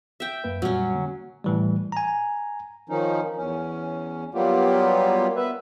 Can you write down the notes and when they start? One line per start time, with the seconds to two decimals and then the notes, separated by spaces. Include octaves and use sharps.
0.20 E5 G5
0.44 F#2 A#3 B4
0.62 F2 A#2 F#3 G3 C#4
0.94 D3 A#3
1.44 A2 E3 G3
1.92 G#5 A#5
2.89 D#3 F3 C#4 D#4
3.37 E2 C#4
4.34 F#3 G3 A#3 B3 F4 G4
5.36 B3 B4 E5